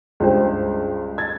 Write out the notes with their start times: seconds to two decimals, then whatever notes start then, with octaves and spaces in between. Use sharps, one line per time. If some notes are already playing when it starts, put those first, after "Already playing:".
0.20 C#2 G2 C5 G5
1.18 G#6 A6